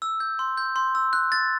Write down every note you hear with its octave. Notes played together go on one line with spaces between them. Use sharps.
E6
G6
C6
G6
C6
E6
F#6
A6